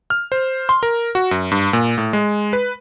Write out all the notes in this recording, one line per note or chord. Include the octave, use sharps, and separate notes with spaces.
F6
C5
C6
A#4
F#4
F#2
G2
A#2
A2
G#3
B4